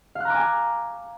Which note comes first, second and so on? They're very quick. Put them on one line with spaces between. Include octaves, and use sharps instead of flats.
F5 F#6 A#5 D6 G#5